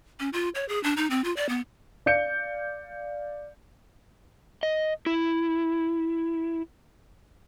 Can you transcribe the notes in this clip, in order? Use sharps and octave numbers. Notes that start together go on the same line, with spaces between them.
C#4
F4
C#5
G#4
D4
D#4
C4
F4
D5
B3
D5 F5 G6 C#7
D#5
E4